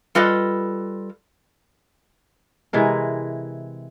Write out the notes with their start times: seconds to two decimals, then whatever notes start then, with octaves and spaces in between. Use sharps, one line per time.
0.15 G3 F4 A4 B4 D#5
2.73 C3 E3 G#3 A#4